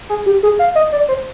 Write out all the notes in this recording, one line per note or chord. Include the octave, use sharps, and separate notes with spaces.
G#4
G4
G#4
F5
D#5
D5
C5